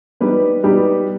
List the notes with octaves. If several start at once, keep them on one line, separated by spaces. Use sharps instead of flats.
G3 B3 D#4 G4 B4
G3 B3 D#4 G4 B4